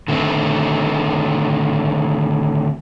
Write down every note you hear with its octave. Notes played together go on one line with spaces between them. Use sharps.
D3 D#3 A3 B3 C4